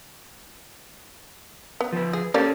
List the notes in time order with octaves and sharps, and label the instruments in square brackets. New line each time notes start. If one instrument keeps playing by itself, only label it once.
[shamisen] B3
[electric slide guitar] F3 B4
[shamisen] G#4
[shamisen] A#3 G4 D5 [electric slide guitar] C#4 A4